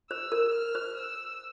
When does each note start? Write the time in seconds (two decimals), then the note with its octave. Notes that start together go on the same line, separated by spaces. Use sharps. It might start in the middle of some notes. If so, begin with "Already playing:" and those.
0.11 C5 E6
0.32 A#4
0.54 F6
0.75 C5
0.98 E6